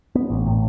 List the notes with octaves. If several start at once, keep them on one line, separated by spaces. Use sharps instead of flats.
B3
A1
A2